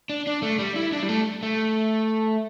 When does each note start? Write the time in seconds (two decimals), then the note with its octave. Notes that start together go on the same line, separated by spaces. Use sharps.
0.10 D4
0.27 D4
0.42 A3
0.59 G3
0.76 E4
0.93 D4
1.03 G3
1.09 A3
1.43 A3